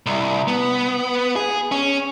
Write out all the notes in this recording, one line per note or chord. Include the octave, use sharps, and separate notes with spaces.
C2
B3
G#4
C#4